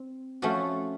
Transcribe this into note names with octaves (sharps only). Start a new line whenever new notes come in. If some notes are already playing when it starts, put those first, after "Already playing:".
Already playing: C4
F3 A3 C#4 F#4